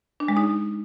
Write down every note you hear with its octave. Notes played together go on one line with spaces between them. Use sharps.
D4
G#3
D#4